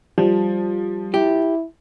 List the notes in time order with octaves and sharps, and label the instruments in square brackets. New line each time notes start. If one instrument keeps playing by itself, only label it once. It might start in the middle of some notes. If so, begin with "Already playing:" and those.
[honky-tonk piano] F3 [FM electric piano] G3
[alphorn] E4 [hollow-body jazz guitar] G4